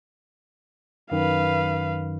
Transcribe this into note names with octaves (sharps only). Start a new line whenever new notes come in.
F#2 D#3 B4 F5